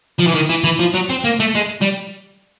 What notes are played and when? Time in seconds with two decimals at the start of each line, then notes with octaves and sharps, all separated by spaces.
0.19 F3
0.27 E3
0.35 D#3
0.49 E3
0.64 E3
0.80 F3
0.94 F#3
1.10 C4
1.25 A#3
1.40 A3
1.55 G#3
1.81 G3